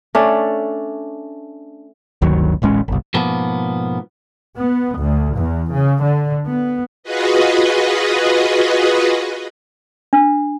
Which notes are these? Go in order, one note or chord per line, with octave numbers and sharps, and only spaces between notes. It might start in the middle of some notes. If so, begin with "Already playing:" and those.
A3 C#4 D4
G1 D2 D#3 F#3
D1 A1 G#3 C#4
G1 C2
G#2 B2 F3 A#3 B3
B3
D2
E2
C#3
D3
B3
F4 F#4 G#4 B4 D#5
D4